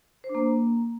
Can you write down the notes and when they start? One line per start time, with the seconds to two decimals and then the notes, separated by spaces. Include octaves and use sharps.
0.24 C5
0.29 D4
0.35 A#3